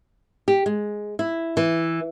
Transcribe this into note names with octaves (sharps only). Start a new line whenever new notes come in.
G4
G#3
E4
E3